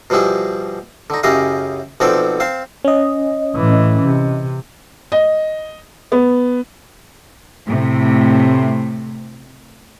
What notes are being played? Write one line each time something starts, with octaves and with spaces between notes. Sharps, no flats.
B2 F3 G3 E4 G#4
D3 D#4
F#2 C#3 E4 G4 D#5 F5
B1 F3 B3 C4 A4 D5
C4 F5 A5
C#4 D#5
A2 E3
C3
D#5
B3
A2 C3 A3